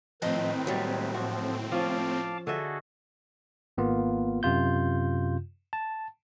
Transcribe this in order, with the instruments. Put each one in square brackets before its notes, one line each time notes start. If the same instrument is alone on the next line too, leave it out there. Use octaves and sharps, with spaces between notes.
[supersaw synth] A2 C4 [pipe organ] D#3 B4 [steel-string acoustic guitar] F3 F4 D#5
[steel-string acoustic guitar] D#2 C#3 [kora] F#3 G3
[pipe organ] F3 [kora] F#4
[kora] F3 C#4 [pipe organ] F5 A5 D6
[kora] D3 D#5 E5 [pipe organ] F#4 G#4 A4
[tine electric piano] G#1 A#3 B3 F4
F#2 C3 F4 G6
A5